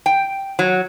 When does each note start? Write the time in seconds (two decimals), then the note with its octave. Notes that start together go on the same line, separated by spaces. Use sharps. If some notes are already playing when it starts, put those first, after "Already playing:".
0.06 G5
0.59 F#3